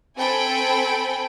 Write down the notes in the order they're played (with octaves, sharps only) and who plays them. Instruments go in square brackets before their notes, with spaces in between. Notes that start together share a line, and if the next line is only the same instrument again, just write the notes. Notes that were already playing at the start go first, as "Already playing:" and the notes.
[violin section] C4 A4 G5 G#5 B5